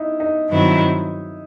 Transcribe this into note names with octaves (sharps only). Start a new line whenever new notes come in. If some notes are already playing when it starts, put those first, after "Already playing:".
Already playing: D#4 E4
D#4
G2 D#3 F#3 C4 E4